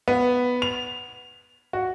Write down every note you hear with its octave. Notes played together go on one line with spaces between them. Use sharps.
B3
F7
F#4